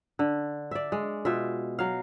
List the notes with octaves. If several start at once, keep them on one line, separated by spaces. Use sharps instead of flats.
D3
D5 E5
G#3
B2 F4 E5
F#3 F5